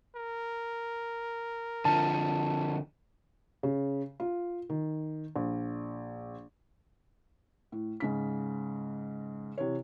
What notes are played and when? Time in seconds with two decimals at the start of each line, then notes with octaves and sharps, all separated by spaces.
0.15 A#4
1.85 D3 F3 A5
3.63 C#3
4.20 F4
4.70 D#3
5.36 A#1
7.72 A2
8.00 G#2 C#3 B6
9.58 C3 E3 C#5